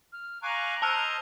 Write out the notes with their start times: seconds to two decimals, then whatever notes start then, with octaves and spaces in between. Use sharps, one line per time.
0.13 F6
0.42 F5 G#5 A#5 C#6 D6 F#6
0.82 C5 D#5 A5 E6 F6 G#6 F7